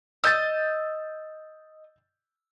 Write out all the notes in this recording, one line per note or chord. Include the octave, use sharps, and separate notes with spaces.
D#5 E6 G6 A6